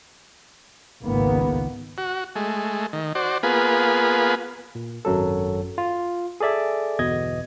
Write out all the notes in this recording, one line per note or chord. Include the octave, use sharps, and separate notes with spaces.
G#1 C#2 D#3 A#3 B3
F#4
G#3 A3
D#3
F#4 C5 D5
A#3 B3 F4 G#4 B4
A#2
G#1 F#2 F#3 A4
F4
G#4 A4 D5 E5 G#5
G1 E2 B2 D#5 G#6